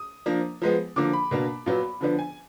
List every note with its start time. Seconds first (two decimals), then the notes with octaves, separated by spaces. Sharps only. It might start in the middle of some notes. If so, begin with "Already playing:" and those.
Already playing: D#6
0.26 F3 A#3 D4
0.62 F3 G#3 B3
0.96 D3 F3 A#3 D6
1.13 B5
1.31 B2 A#3 D4
1.66 A#2 F#3 B3
2.01 D3 F3 B3 D4
2.19 G#5